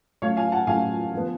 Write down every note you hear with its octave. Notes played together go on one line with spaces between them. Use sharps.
C#3 F#3 A3 C#5 F5
F5 G#5
F#5 A5
C#3 F#3 A3 F5 G#5
D3 F3 B3